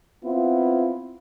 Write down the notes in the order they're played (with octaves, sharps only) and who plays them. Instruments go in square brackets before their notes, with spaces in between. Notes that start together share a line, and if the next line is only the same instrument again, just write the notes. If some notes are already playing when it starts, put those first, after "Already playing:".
[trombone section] B3 C4 E4 F4